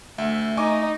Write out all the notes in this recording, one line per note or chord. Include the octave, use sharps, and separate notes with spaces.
D2 A3 E5
D#4 G#5 C#6 D6